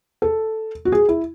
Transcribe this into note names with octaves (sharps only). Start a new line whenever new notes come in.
A4
F#4
G#4
E4